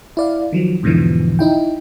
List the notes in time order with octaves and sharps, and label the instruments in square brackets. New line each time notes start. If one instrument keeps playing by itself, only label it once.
[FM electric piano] E4 D5 F5
D#3 F3 F#3
E2 G#2 B2 D3 E3 F3
D#4 E4 G5